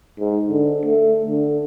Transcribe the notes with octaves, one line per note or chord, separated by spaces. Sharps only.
G#2
D3
A3
D3